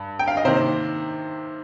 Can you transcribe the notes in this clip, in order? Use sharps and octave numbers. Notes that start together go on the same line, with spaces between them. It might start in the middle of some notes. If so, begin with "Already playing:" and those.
Already playing: G2
G5
F5
D#5
C3 D#3 A#3 C5